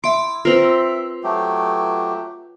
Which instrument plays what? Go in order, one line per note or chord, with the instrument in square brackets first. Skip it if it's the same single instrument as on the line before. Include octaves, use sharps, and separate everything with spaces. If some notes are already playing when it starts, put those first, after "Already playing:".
[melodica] E4 [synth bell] E5 C6 [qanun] D6
[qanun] C4 A#4 [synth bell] F4 B4 [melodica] E5
[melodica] F#3 A3 G4